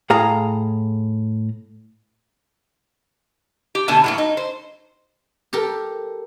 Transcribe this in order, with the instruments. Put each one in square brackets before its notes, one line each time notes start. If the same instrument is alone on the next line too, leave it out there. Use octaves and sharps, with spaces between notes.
[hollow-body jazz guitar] A2 G#4 F5 A#5
[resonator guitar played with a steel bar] G4
B2 D3 A3 B3 G#5 A5
A2 F#3 A#3
D#4
C5
[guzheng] G4 A4 A#4